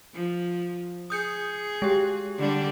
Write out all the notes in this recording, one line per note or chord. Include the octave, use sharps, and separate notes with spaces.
F3
G#4 D#6 G6 C#7
G#3 G4
D3 G3 D4